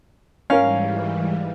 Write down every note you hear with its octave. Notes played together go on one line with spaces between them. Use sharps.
G#2 E3 G3 C#4 A#4 F5